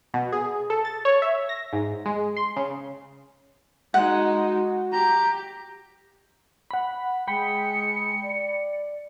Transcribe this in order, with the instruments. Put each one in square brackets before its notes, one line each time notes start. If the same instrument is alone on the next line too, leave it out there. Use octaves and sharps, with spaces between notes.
[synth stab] B2
G#4
A4
A6
C#5
E5
A#6
G#2
G#3
C6
C#3
[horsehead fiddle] G#3 D#4 [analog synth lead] F#4 [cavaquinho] F#5
[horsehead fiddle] G4 [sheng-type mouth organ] A#5
[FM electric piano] F#5 B5
[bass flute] G#3 [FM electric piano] G5 B5 [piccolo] C#7
[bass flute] D5